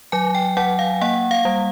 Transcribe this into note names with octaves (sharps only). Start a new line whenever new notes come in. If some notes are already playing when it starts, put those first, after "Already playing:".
F#3 G#5
G5
F#3 F#5
F5
A#3 F#5
F5
G3